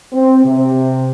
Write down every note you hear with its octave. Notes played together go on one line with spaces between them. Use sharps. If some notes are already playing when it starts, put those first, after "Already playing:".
C4
C3